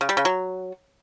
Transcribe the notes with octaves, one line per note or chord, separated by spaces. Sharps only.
C#3
G3
C#3
F#3